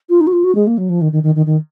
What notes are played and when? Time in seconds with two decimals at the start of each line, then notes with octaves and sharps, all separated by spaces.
0.09 F4
0.21 D#4
0.27 F#4
0.32 F4
0.44 F#4
0.55 G#3
0.67 A#3
0.78 F#3
0.89 F3
1.01 D#3
1.12 D#3
1.23 D#3
1.35 D#3
1.46 D#3